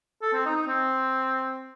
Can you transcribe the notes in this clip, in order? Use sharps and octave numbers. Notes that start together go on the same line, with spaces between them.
A4
C4
D#4
D#4
C4